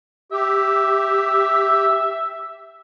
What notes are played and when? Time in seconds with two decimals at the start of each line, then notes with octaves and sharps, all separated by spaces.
0.32 G4 E5